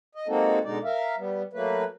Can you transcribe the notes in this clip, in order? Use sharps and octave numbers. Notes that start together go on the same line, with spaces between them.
D#5
G#3 A#3 C4 D#4 F#4 A4
B2 D3 G#3 D#4 D5
A#4 E5 F5
G3 B3
F#3 A3 A#3 B4